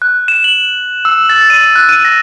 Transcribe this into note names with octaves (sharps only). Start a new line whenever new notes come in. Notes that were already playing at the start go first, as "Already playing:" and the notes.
F#6
E7
F#7
E6
A6
D#7
F#6
D#7
A#6